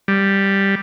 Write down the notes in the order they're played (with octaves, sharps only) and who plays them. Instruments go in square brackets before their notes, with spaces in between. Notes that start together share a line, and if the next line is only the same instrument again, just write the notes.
[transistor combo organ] G3